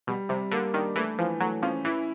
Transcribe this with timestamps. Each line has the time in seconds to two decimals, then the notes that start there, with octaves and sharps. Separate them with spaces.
0.07 B2 G3
0.29 C3 G3
0.51 D3 A#3
0.74 D#3 D4
0.96 E3 A3
1.19 E3 F3
1.40 F#3 A3
1.62 F3 C#4
1.85 E3 E4